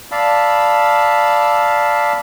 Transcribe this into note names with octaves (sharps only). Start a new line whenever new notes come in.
D5 F5 A5 B5 E6